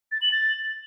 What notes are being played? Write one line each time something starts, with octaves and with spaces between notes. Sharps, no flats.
A6
F#7
A6